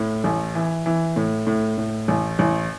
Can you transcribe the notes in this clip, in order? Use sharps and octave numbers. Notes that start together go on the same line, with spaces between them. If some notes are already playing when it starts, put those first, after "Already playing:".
Already playing: A2
A1
E3
E3
A2
A2
A2
A1
A1